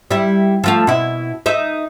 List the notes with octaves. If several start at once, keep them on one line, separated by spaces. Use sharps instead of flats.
G3 E4
F3 A3 F5
B2 E4
D#4 D#5 E5